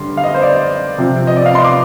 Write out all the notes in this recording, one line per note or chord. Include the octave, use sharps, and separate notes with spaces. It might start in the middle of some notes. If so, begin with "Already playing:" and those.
Already playing: G2 D3 G3 C6
F5
D#5
C5
D5
C3 F3 C4
D#5
D5
F5
C6
D6